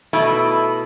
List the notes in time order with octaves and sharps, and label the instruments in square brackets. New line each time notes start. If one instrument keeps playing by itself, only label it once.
[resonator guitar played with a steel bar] B2 A3 E4